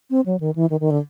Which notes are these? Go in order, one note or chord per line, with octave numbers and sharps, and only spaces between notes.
C4
F#3
D#3
E3
D#3
D#3
D3